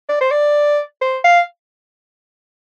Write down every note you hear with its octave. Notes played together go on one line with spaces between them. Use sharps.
D5
C5
D5
C5
F5